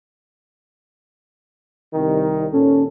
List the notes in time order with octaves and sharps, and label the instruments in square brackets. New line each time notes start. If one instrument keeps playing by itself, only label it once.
[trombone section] C2 D#3
[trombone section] D#2 A#2 A4 [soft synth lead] C#4